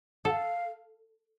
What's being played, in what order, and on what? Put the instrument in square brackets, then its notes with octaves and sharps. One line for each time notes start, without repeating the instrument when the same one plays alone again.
[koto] A4 [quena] F#5
[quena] F5